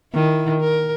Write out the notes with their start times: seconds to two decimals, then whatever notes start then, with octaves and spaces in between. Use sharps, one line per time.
0.13 D#3 E4
0.60 A#4